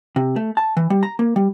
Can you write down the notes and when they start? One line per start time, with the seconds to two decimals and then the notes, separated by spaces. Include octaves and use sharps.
0.16 C3
0.36 A3
0.57 A5
0.77 E3
0.90 G3
1.03 A#5
1.19 A#3
1.36 G3